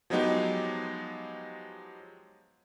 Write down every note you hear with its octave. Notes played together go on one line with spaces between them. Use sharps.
F3 F#3 G#3 B3 D#4 G4